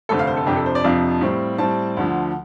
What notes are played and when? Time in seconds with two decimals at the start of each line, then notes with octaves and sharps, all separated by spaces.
0.09 F1 F2 D3 A3 C4 A4
0.19 F5
0.27 C5
0.37 A4
0.46 F2 C3 F3 D4 G4
0.57 A4
0.66 C5
0.75 D5
0.84 F2 C3 F3 D4 F5
1.21 A2 G3 C4
1.58 A2 G3 C4 A5
1.97 D2 D3 F3